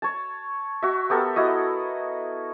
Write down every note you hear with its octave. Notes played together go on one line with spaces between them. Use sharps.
C#5 A5
F#4 E5
B3 G4 A4 A#4
E4 F#4 D#5